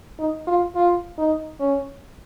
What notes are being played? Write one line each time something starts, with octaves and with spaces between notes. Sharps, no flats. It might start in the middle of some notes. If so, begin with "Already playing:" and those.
D#4
F4
F4
D#4
C#4